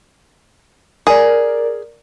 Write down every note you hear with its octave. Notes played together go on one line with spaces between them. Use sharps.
G#4 A#4 D5